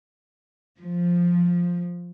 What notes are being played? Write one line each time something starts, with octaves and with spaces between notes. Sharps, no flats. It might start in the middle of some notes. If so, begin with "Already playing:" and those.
F3